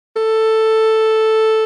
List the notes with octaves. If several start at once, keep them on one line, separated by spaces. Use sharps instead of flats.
A4